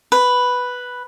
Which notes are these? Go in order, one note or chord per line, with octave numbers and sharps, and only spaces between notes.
B4